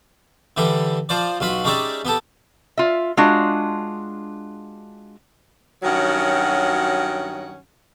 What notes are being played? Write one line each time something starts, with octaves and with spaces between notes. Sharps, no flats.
D3 E3 G3 G4
F3 C5 D5
B1 F4 F#4 B5
G#3 C#4 D#4 G4 D5 E5
B3 G4 A4
F4 E5
G#3 D4 F4 F#4
G2 D#3 F#3 C#4 F#4 F#5